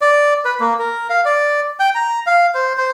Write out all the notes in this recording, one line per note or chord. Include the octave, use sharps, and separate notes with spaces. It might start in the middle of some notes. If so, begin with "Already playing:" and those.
D5
B4
A#3
A#4
F5
D5
G5
A#5
F5
C5
C5